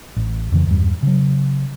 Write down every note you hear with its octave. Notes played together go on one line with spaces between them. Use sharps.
A1
F2 C#3 E3
E2 G2 G3
C#3 F#3